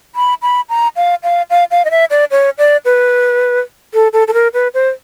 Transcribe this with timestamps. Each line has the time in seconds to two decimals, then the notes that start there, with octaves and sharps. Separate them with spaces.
0.15 B5
0.42 B5
0.69 A#5
0.96 F5
1.23 F5
1.50 F5
1.71 F5
1.85 D#5
1.91 E5
2.11 D5
2.31 C#5
2.58 D5
2.85 B4
3.94 A4
4.13 A4
4.28 A4
4.34 A#4
4.54 B4
4.74 C5